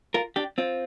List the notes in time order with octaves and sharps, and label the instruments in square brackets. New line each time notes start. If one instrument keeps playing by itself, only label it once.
[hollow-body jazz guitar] F4 A#4
D4 G4
C4 F4